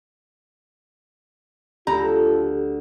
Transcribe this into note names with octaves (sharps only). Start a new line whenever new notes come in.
D2 F4 G4 A4 A#5